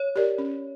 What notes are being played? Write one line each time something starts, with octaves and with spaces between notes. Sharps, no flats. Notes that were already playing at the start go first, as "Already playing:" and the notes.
Already playing: C#5
G4 A#4 D5
C#4